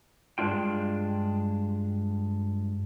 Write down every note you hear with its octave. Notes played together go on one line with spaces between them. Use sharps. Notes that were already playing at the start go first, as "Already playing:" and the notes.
G2 G#3 B3 D4 F4 G5